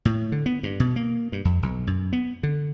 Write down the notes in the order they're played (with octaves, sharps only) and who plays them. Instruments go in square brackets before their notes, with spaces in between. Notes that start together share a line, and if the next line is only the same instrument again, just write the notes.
[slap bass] A2
D3
B3
G2
B2
A#3
G2
F2
B1
F#2
B3
D3